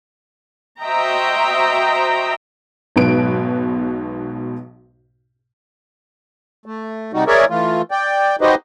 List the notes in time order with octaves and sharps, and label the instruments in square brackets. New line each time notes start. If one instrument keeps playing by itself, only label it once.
[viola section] F#4 C5 D#5 E5 G5 A#5
[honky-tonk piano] B1 G#2 B2 B4 D7
[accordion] A3
C3 G3 D#4 F#4
G#4 A#4 C#5 D5 E5
E3 A3 F4
D5 G5
D#4 F#4 G4 B4 C5 D#5